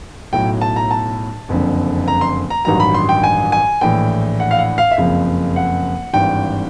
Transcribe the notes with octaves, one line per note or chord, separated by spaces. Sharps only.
B1 A2 F#3 G5
A5
A#5
A5
F#1 F2 D3
A#5
C6
A#5
A1 G2 D#3 F#3 A#5
B5
C6
G5
G#5
G#5
A#1 A2 E3 G5
F#5
F5
F#5
F5
E5
F#1 F2 C#3 F3 F5
F#5
G#1 G2 E3 G5